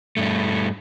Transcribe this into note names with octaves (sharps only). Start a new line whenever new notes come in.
G2 A3